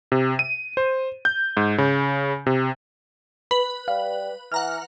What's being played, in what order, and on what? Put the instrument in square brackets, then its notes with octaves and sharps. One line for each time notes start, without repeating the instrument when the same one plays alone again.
[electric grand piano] C3
D#7
C5
G6
G#2
C#3
C3
[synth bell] B4 [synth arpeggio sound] B5
[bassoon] G3 [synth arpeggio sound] F5
[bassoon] E3 [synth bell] F#5 A#5 F6